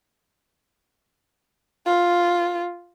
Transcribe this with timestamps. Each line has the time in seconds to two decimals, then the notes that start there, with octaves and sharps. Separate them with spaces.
1.87 F4